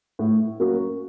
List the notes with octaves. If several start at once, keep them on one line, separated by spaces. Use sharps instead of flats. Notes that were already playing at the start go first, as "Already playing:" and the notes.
A2
F#3 A#3 C#4 F#4